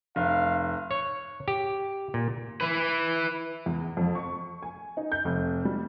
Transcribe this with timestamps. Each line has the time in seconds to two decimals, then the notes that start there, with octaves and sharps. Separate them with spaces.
0.16 F1 F5
0.91 C#5
1.48 G4
2.14 A#2
2.61 E4 B4
3.66 E2
3.97 F2
4.15 C#6
4.62 G#5
4.97 D#4
5.12 G6
5.25 F1
5.65 G3